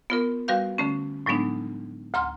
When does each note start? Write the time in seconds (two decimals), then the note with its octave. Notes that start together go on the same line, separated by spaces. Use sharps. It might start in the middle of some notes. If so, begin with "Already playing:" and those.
0.10 B3 F4 A#4
0.48 G3 F#4 B4 F5 G6
0.78 D3 A3 C#4
1.26 A2 F#3 G#3 B3 D4 D#4
2.14 D2 F#5 A#5 C6 F6